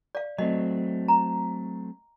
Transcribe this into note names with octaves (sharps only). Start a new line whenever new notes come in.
D5 F5
F#3 A3 C4 D#5
A#5